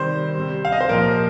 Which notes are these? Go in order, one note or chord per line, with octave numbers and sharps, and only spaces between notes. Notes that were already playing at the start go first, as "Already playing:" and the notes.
Already playing: C3 D#3 G3 C5
C3 G3
F5
D#5
C5
A#2 F3 A#4